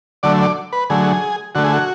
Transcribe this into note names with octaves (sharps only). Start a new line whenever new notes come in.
D3 F#3 A3 D5
D5
B4
D3 F#3 A3 G#4
D3 A3 F#4
G#4
F#4